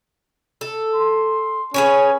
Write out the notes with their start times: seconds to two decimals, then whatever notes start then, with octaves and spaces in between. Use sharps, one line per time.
0.61 A4
0.95 C6
1.74 C#4 G#4 B4 C#5